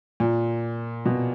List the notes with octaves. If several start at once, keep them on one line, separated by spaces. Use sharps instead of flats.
A#2
B2